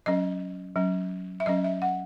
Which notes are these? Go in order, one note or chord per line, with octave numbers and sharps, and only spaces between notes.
F#3 C#4 D#5
F#3 C#4
E5
F#3 C#4 D#5
E5
F#5